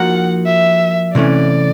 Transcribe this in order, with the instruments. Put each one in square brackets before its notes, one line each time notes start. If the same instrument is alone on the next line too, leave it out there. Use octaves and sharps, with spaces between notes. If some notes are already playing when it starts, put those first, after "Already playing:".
Already playing: [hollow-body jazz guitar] F3 A#3 D#4 F#4 A#4 [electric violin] F#5
[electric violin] E5
[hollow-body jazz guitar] C3 E3 A3 C#4 [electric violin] D5